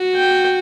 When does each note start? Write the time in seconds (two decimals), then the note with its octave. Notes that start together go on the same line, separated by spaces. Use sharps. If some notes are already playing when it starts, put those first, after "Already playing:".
Already playing: F#4
0.15 G5